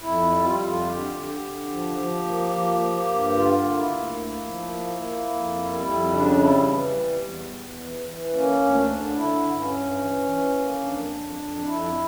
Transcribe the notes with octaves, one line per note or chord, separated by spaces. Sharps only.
F2 E4
G3
F4
E4
F2 F4
D3 G4
D3
G4
D3
F3
F3
A#3
F3
A#3
G2
D3 F4
A#3
E4
D2
A#3
F3
A#3
A#3
F2
G3
F2 E4
C#3 D4
G3 E4
E3
G3
E2
E2
E3
E3
A#3 C#4
D2
D4
D3
D3 E4
G2
C#4
G2
E3
E3
A#3
F2 D4
F2
F2
F2 E4